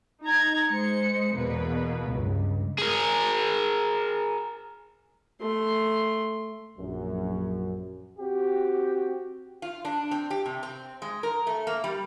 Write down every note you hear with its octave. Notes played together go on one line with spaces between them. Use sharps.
D#4 A#5 G#6
G#3 C5 C#7
E2 B2 A#3 B4
C#2 G2
G#4 A#4
A3 C6
A#1 F#2
C4 F#4 G4
F4
D4
C4
G4
C3
C4
G#3
A#4
A3
A#3
G3